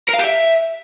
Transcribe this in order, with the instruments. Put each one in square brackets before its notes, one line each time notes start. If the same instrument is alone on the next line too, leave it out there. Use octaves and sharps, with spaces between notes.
[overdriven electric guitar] A#4
F5
G4
E5